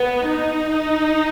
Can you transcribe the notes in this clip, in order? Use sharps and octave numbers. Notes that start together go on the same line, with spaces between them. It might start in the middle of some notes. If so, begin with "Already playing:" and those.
Already playing: B3
D#4